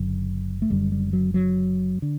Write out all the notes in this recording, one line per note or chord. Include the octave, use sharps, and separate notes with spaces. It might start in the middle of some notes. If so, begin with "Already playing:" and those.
Already playing: F#1 F#2 D3 F#3
A3
F#1 F#2 D3 G3
G3
F#3
F#3
D3